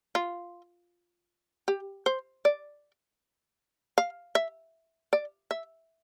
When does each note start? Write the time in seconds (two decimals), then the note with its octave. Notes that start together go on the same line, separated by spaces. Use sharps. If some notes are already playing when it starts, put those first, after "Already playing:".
0.15 F4
1.68 G4
2.06 C5
2.45 D5
3.98 F5
4.35 E5
5.13 D5
5.51 E5